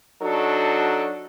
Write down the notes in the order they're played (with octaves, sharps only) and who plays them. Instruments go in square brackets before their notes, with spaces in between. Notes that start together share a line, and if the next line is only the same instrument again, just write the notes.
[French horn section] F#3 D4 D#4 F#4 A4